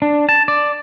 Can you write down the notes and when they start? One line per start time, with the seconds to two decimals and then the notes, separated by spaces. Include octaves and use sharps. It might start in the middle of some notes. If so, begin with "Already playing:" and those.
0.02 D4
0.29 A5
0.48 D5